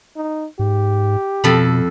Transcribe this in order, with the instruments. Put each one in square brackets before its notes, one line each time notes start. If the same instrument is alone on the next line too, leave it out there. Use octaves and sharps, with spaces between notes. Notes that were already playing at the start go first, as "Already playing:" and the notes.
[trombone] D#4
[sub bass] G#2 [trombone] G4
[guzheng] F2 A4 B5 [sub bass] B2